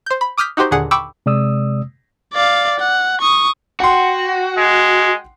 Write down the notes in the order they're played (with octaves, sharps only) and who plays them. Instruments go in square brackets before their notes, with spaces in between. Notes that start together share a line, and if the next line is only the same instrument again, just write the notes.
[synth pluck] C5 G6
B5
D6 D#6 F6 G6 B6
D#4 F#4 G4 C5
D#2 A#2 D3 G#4 F#5
G5 B5 C#6 D6 E6
[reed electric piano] C3 G#3 D5 D#6 E6
[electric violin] D5 F5
F#5
C#6 D#6
[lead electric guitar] F#4 [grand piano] F#5 G5 C6
[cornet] G#3